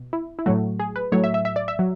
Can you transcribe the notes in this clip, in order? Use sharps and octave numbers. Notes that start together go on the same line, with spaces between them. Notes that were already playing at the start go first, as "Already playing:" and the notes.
Already playing: B2
E4
E4
A2 F#3 A3 F#4
G#4
B4
A2 F#3 A3 C#5
E5
E5
E5
D5
E5
F#3